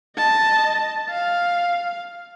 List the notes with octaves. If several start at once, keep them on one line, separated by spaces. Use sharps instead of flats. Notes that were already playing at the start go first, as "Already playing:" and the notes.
D#5 A5
F5